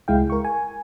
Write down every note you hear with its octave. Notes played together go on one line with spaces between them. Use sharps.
C#2 G#3 E4 F5 G5
A#4 C#6
G#5